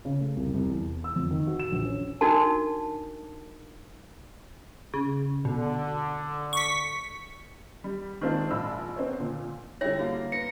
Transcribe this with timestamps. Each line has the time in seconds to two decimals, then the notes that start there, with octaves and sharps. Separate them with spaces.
0.05 C#3
0.20 A3
0.36 C2
0.54 C2
0.69 E2
1.04 E6
1.16 F2
1.31 D#3
1.47 F#4
1.60 E7
1.72 A#1
1.85 C#4
2.21 D4 D#4 F#4 A#4 A5
4.94 C#3
5.45 B2 D3
6.53 C#6 B6
7.84 G3
8.21 D#3 G#3 A#3 C4 D4 F4
8.51 A#1 G#3 D4 B5 E6
8.96 B3 C4 A#4 C5 C#5
9.20 A#2 D3
9.81 D3 G3 E4 C#5 G5 A#6
9.99 A#3 F#4 F5
10.32 B3 A#6 C#7